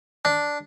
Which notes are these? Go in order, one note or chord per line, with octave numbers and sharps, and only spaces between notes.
D4